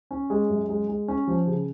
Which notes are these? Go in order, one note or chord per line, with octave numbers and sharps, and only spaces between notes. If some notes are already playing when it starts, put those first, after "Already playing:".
C#4
G#3
F#2
G#3
G#3
C#4
F3
C#3